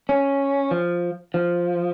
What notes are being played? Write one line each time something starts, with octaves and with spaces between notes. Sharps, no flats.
C#4
F3
F3